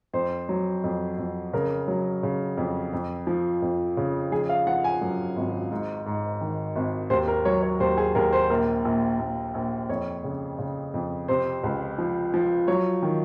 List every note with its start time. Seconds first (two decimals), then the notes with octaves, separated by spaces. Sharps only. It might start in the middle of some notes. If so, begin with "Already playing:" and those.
0.13 F2 C5
0.49 F#3
0.84 F2
1.18 F2
1.53 C#3 A#4
1.88 F#3
2.23 C#3
2.57 F2
2.93 F2
3.27 F3
3.62 F2
3.97 C#3
4.32 F3 G#4
4.49 F5
4.67 F3 F#5
4.84 G#5
5.02 F#2
5.37 G#1
5.71 G#2
6.06 G#2
6.41 D#3
6.75 G#1
7.10 D#2 C5
7.28 A#4
7.45 F#3 C#5
7.63 C#5
7.80 D#2 C5
7.97 G#4
8.15 D#2 A#4
8.33 C5
8.50 A#1 A#4
8.85 A#1
9.19 A#1
9.54 A#1
9.89 F2 C#5
10.24 C#3
10.59 C#3
10.94 F2
11.28 C3 C5
11.64 C#2
11.98 F3
12.34 F3
12.68 F#3 C#5
13.03 D#3